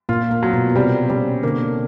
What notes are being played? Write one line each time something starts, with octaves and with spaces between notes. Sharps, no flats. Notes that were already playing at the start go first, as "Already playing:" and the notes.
A#2 A#3 F4
A#2 A#3
F#3
B2 B3
B3
C3 G3 C4
C#3 G3 C#4
D3 A#3 D4